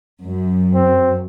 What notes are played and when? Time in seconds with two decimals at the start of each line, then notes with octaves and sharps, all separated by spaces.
0.23 F#2
0.74 C4